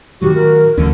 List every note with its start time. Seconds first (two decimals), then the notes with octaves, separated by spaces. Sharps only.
0.22 A2 D#3 F#3 F#4 G4
0.34 A#4
0.78 D2 D3 E3 F3 C#4